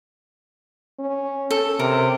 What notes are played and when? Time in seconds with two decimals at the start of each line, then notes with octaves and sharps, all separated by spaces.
0.99 C#4
1.51 A4
1.79 C3 A#4